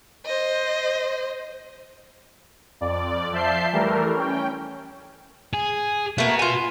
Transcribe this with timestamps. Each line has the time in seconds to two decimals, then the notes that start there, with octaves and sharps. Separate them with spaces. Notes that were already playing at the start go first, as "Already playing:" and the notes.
0.25 C5 D#5
2.81 F2 D5
3.32 F3 E5 A5 G6 C7
3.72 E3 G3 A3 A#4
4.15 C#4 G5
5.54 G#4
6.18 A3 A#3 F#4 B4
6.39 F4 G#5